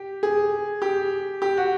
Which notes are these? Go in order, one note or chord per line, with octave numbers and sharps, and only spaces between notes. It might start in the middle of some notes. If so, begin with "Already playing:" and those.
Already playing: G4
G#4
G4
G4
F#4